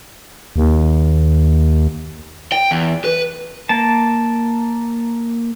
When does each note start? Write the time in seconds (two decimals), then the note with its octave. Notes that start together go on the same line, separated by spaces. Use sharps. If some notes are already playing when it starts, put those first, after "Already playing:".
0.56 D#2
2.52 G5
2.71 E2
3.04 B4
3.69 A#3 A5